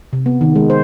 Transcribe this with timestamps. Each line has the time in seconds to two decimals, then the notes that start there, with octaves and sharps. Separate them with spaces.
0.13 C3
0.26 B3
0.41 D#3
0.56 G#3
0.70 C5